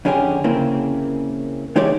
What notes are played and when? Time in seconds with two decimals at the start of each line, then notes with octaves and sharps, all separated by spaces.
0.05 F2 D3 C#4 G4 G#4
0.44 C#3 A#3 C4 E4
1.76 E3 G#3 D#4 G4 C#5 D5